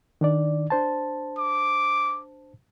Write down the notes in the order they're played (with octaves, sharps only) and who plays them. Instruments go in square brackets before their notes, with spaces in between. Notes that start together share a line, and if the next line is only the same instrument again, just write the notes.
[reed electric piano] D#3 D4 D5
D4 C5 A5
[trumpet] D6